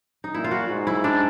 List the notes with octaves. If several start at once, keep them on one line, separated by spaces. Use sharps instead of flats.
D#4
A#2 E4
F4
F#4
G#2
E4
D4